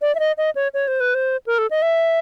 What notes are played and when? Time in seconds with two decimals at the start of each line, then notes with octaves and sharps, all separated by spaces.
0.02 D5
0.15 E5
0.19 D#5
0.38 D#5
0.55 C#5
0.74 C#5
0.88 C5
1.00 B4
1.15 C5
1.47 A#4
1.58 A4
1.71 D#5
1.82 E5